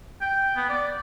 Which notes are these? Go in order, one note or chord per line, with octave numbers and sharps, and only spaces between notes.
G5
B3
D5